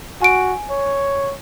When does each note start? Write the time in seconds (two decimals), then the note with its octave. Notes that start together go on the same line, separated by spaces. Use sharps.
0.21 F#4 G#5 D7
0.70 C#5